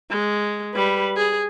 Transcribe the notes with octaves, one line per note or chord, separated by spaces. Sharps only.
G#3
G3 B4
G#4